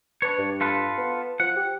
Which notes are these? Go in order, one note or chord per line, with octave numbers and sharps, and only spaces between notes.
D4 B4 C#5
G2
F4 A4 B4
B3
F3 F#5
G4